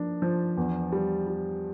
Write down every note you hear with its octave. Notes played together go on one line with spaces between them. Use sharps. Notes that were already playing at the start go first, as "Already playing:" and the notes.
Already playing: F3 A#3 D4
F3
E2
G3
G3